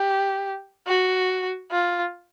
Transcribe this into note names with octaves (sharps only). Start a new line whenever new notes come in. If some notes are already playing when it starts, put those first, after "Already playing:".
Already playing: G4
F#4
F4